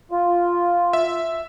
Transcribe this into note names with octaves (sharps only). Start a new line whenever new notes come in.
F4
E5